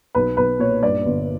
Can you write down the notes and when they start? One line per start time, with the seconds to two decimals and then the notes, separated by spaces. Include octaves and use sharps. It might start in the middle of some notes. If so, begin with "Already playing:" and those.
0.15 B1 B4
0.37 B1 B4
0.59 A#2 C#5
0.83 G2 D5
1.06 G1